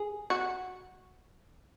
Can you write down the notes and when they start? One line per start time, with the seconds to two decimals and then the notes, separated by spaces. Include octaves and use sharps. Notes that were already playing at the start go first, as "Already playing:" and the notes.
Already playing: G#4
0.30 F#4